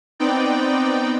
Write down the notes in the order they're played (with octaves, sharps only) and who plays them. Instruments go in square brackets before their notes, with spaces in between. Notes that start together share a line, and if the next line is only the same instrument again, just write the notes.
[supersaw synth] B3 C4 D#4 D5 G5